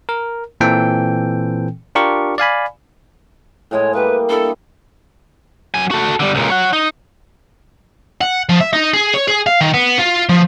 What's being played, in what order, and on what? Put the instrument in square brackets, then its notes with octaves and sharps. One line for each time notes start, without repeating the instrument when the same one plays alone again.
[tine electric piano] A#4
A#2 E3 C4 A4 G5
D4 F4 G4 A#4 C#6
D5 F5 G#5 B5
[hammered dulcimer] A2 G#3 D#5 [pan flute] C#5
[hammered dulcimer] G3 A#3 [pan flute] B4
[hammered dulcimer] D4 E4 D#5 [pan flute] A4
[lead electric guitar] F#3 G#5
F#4 A4
D3 G3
C#2 A#2
C#5 F#5
D#4
[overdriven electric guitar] F#5
F3
E5
D#4
G#4
C#5
G#4
F5
D#3
B3
F4
F3